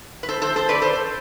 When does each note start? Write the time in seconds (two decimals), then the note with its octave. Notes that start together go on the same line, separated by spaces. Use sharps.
0.23 B4
0.29 A4 C5
0.42 A4 C5
0.56 A4 C5
0.69 B4 D5
0.82 A4 C5